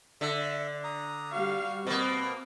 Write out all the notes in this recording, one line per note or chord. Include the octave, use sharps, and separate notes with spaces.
D3 E5
A#5 D#6
G3 F#4 F5 C#6
B2 A#3 C4